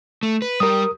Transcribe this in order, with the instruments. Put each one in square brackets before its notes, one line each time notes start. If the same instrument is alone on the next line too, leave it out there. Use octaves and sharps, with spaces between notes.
[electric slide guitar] A3
B4
[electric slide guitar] G3 G4 [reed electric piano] A#4 D#6